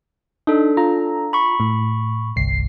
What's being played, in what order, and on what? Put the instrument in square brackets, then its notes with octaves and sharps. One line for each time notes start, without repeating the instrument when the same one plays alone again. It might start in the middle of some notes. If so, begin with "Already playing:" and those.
[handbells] D4 A4 [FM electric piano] D#4
[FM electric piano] F4 A#5
[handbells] B5 C#6
[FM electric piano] A2
G1 C2 C7